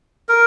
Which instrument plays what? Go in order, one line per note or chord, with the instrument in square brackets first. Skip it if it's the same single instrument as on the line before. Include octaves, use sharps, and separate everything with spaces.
[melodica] A#4